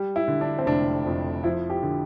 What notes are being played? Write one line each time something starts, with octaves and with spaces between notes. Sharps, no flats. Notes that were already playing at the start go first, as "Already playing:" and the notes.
Already playing: G3
E4
D3
D4
C4
F1 D4
F2
F3 E4
G4
D3